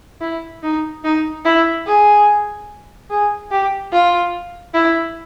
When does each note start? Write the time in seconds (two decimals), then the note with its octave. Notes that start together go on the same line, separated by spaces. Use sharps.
0.21 E4
0.63 D#4
1.04 D#4
1.45 E4
1.87 G#4
3.10 G#4
3.51 G4
3.92 F4
4.74 E4